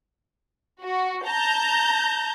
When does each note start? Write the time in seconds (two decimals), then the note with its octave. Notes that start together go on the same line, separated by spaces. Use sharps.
0.82 F#4
1.26 A5 A#5 G6